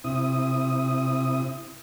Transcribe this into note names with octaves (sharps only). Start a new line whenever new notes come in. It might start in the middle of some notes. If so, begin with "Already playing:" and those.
C3 E4 D#6